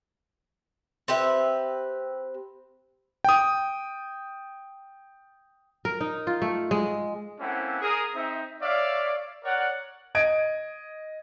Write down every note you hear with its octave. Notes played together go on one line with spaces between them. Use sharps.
C4 G4 B4 E5
G5 D#6
A#4
D#4
F4
A3
G#3
A#3 C4 C#4 E4 A4 F#5
G#4 A#4 D#6
C4 D#4 E5
C#5 D5 E5 F5
A#4 C#5 D5 F#5
D#5 G#6 D7